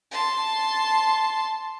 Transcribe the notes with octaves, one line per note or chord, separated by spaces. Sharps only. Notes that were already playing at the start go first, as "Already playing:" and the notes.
A5 C6